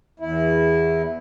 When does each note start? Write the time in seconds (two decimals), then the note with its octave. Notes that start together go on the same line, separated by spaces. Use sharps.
0.20 E2 E4